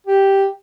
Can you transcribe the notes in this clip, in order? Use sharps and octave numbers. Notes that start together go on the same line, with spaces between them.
G4